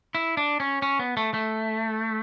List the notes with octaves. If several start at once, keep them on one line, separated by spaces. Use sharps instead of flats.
E4
D4
C#4
C#4
B3
A3
A3